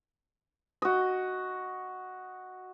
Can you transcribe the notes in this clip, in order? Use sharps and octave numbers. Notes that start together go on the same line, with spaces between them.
F#4 D#5